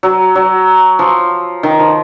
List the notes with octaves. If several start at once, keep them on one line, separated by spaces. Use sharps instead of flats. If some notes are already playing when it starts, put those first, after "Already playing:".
F#3
F#3
F3
D#3
F3